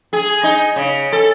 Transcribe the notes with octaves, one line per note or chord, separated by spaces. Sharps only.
G#4
D#4
C#3
A4